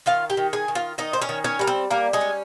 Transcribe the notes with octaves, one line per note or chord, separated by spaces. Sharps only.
D#3 F4 F5
G4 G5
D#3
G#4 G#5
D#3
F4 F5
D#3 D#4 D#5
C5
C#4 C#5
D#3
C#4 C#5
G3 A#4
C4 C5
G3 A#3 A#4
G#3 G#4
C#4